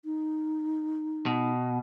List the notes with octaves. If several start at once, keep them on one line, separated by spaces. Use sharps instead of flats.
D#4
B2